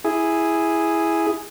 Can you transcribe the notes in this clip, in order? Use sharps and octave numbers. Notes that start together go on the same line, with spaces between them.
E4 G#4